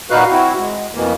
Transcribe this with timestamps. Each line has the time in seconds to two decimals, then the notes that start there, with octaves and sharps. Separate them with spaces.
0.11 A#2 D#4 F#4 B4 F5 F#6
0.31 C4 E4 F#4
0.58 G#3
0.95 F2 B2 E3 A#3